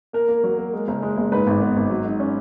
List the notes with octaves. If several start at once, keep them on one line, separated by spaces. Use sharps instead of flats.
A#3 A#4
A#3
F#3
A#3
G#3
F#1
G#3
F#1
G#2 B4
G#1
B3
G#1
F#3
G#2
C#4